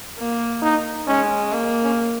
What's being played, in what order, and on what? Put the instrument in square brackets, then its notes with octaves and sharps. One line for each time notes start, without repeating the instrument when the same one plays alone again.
[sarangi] A#3
[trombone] D#4
[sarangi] G#3 [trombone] C#4
[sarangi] A#3
[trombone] C#4